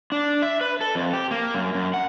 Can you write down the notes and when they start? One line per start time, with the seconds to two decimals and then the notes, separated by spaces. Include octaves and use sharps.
0.12 D4
0.42 E5
0.61 B4
0.81 A4
0.95 F2
1.13 G4
1.31 A#3
1.54 F#2
1.74 F#2
1.94 F#5